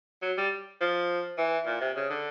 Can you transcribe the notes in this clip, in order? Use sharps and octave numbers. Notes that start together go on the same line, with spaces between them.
F#3
G3
F3
E3
A#2
C3
C#3
D3